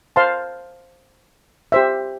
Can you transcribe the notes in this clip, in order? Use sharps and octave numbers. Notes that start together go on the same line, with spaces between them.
C5 F5 A5 C6
G4 C5 E5